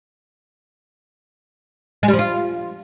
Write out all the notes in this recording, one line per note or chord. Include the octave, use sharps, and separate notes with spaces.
G#3
G3
F3
F4